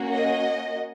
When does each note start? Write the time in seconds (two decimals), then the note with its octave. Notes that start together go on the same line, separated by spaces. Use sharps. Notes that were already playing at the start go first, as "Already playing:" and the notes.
Already playing: A#3 C#4 F#4
0.15 D#5